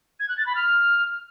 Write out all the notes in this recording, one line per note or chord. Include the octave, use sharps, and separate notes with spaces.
G#6
F#6
A6
B5
F6